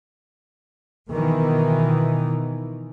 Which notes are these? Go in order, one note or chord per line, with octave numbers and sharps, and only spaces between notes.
B2 D#3 E3